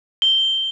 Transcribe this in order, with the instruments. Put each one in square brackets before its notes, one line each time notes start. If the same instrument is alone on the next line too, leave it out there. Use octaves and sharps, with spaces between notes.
[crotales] G7